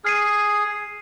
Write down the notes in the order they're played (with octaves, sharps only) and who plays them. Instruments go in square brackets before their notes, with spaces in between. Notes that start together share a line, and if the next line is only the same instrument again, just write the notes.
[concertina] G#4 [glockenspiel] F6 C7 D#7